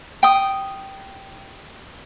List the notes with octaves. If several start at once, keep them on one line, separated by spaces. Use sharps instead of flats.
G5 D#6